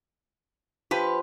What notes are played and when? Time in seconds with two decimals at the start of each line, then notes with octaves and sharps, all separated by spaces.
0.91 F3 G4 B4